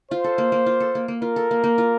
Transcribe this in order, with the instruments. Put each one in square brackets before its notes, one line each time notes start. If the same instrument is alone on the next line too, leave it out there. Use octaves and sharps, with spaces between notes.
[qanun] F4 [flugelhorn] C5
[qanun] A4
A#3
A#3
F4
A4
A#3
A#3
[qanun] F4 [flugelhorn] A#4
[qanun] A4
A#3
A#3
F4